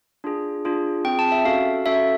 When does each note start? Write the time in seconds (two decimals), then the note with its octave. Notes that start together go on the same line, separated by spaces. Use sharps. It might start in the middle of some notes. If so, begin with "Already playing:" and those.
0.24 D4 F4 G#4
0.65 D4 F4 G#4
1.05 C4 F4 G#4 G5
1.19 A5
1.32 E5
1.45 C#4 F#4 A4 F5
1.86 C#4 F#4 A4 E5